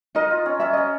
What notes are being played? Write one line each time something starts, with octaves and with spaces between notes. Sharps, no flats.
D#4 A#4 D#5
F4
C#4
C#4 E5
C#4 D#5